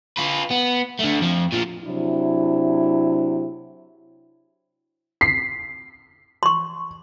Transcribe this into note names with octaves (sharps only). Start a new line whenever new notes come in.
F4 B4
B3
D3 A3
F2 F3
A#2 F3
C3 F#3 D4 E4
B6 C7
C6 C#6